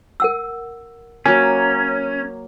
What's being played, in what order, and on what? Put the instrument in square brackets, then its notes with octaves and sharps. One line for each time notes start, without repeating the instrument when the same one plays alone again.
[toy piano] A#4 F#5 E6
[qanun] F#3 A#3 [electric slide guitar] C#4 [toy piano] G#5